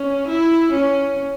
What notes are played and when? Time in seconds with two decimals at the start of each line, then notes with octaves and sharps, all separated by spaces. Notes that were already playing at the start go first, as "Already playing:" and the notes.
Already playing: C#4
0.28 E4
0.72 C#4